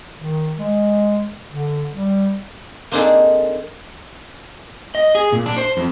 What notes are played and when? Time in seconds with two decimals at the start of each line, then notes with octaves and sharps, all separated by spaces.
0.19 D#3
0.58 G#3
1.50 D3
1.93 G3
2.92 A#3 C4 D4 D#4 G#4 A4
4.95 D#5
5.15 G#4
5.32 A#2
5.46 D4
5.58 C5
5.77 F2